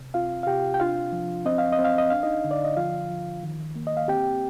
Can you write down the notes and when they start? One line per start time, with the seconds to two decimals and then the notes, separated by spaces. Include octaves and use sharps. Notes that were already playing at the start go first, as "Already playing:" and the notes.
Already playing: C3
0.14 C4 F4 F5
0.43 F5
0.47 C3 G4 G5
0.74 G5
0.80 D4 F4 F5
1.13 F3
1.46 C4 D#5
1.58 F5
1.72 D#5
1.79 C4
1.85 F5
1.98 D#5
2.10 D4 F5
2.23 D#4 D#5
2.44 D3
2.51 D5
2.64 D#5
2.77 F3 F4 F5
3.11 F3
3.43 D#3
3.76 A#3
3.87 D#5
3.97 F5
4.08 C4 G4 G5